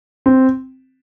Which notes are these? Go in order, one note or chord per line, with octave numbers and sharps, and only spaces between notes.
C4